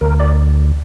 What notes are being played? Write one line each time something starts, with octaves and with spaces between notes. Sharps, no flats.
D2 A#4
D5